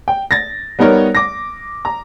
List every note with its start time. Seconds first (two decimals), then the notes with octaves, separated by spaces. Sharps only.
0.08 G5
0.31 A6 A#6
0.79 G3 B3 D#4 A#4 C#5
1.15 D6 A#6
1.85 A#5